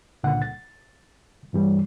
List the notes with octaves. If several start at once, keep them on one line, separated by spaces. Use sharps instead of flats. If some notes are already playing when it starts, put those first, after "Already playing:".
C#2 A#2 D3 F#5
A6
G2 E3 G3